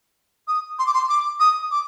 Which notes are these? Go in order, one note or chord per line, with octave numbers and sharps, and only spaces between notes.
D#6
C6
D6
C6
D6
D#6
D6